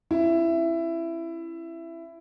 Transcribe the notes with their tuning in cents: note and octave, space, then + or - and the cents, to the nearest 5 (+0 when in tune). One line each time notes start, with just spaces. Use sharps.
C#4 -40 E4 +15